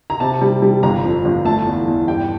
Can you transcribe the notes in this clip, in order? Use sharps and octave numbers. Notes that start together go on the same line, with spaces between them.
A#5
C3 A5
G3
G3
G1 A#5
F2
G1
A3 A5
E2
E2
G2 G5